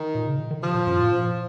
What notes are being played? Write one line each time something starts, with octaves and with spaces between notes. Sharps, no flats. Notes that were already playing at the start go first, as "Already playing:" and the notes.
Already playing: D#3
A#2
C#3
D#3
D#3
C3 F3
A#2
F#2
A2
A#2